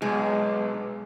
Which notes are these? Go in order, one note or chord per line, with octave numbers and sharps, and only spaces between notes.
B1 G#3